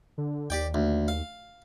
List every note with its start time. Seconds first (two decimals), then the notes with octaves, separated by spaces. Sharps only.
0.18 D3
0.50 D#2 G4 D5 G5
0.74 D2
1.08 F5